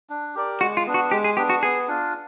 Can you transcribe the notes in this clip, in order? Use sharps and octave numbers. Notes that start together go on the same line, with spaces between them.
D4
G4 A#4 D5
G#3 F#4
F4
B3 D4
F#4
G#3 G4
G#4
B3 D4 G4
F#4
B3 G#4
D4 F4